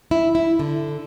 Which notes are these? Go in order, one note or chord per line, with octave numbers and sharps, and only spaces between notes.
E4
E4
D3